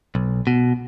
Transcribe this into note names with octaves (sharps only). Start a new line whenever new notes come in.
B1
B2